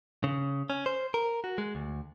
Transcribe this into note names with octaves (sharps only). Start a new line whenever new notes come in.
C#3
C#4
C5
A#4
F#4
G#3
D2